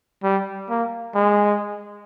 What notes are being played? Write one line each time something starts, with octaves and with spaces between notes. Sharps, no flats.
G3
A#3
G#3